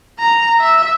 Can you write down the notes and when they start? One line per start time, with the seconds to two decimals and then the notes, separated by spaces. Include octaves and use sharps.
0.19 A#5
0.60 E5